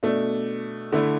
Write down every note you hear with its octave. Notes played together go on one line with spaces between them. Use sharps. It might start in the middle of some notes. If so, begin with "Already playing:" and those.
B2 A3 D4
D3 A3 E4